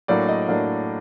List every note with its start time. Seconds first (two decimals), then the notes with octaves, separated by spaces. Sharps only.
0.08 A2 F#3 A#3 D4 D5
0.28 D#5
0.48 A2 F#3 A#3 D4